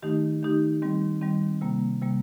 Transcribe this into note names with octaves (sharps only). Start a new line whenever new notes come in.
D#3 A3 D#4 G4
D#3 A3 D#4 G4
D#3 G3 C4
D#3 G3 C4
C3 G3 A#3
C3 G3 A#3